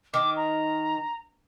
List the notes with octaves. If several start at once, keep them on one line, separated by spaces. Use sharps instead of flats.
D#3 D6
A#5